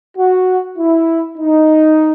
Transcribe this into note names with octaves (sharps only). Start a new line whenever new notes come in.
F#4
E4
D#4